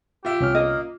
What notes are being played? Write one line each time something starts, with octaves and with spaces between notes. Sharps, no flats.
F4 G4 E5
C2 C#4 F6
A#3 D#5